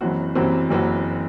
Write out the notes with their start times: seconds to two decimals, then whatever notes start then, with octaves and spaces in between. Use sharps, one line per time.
0.01 F#1 F#2 E3 C4 F#4
0.35 F#1 F#2 E3 C4 F#4
0.70 F#1 F#2 E3 C4 F#4